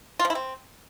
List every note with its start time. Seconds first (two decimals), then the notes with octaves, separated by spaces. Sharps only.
0.19 F4
0.25 F3
0.30 E4
0.35 C4